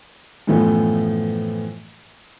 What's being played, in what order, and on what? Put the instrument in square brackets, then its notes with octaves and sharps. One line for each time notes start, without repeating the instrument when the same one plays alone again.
[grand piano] F#2 A2 E3 F3 A3 B3